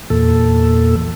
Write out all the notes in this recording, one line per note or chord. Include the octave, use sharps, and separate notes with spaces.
E2 A#2 A4